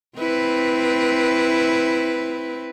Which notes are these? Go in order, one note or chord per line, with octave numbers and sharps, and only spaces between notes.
C4 E4 B4